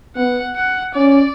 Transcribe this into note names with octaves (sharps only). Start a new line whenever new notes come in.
B3 F#5
F#5
C#4 D5